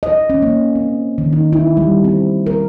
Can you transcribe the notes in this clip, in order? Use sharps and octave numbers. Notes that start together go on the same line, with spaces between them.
D#5
C#4
A#3
C4
D#3
D#4
E4
G3
C4
A#4